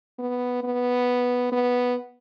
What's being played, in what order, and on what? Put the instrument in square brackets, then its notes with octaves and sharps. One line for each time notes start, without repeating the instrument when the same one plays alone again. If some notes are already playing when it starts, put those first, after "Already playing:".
[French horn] B3
B3
B3